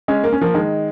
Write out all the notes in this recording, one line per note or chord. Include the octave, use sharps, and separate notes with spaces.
G#3 C#4
A#3
C#4
F3 A#3
D#3 G#3